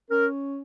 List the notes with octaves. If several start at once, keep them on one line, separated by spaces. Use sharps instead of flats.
C#4 A#4